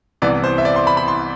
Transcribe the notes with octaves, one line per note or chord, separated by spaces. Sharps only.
C2 C3 E3 B3 D5
C5
E5
D5
C6
B5
B5
C6